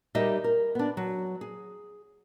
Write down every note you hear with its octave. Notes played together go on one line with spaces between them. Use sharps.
G3 D#4 G4 A#4 D#5 E5
A#4
B3 D4
F#3
G#4